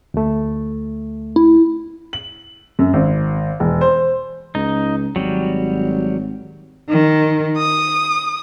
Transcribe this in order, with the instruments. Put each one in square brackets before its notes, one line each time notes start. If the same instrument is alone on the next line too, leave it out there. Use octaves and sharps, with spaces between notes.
[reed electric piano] D2 A3
[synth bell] E4
[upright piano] F#7
F#2
G#1
E1
C5
[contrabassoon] C#2 [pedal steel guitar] D#4
[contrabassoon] G#1 [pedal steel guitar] F#3 G3
[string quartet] D#3
D#6